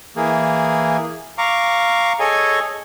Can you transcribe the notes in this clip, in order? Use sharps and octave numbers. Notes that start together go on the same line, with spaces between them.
E3 A#3 G#4
F5 A#5 C#6 D6
G#4 A4 C#5 D#5 G#5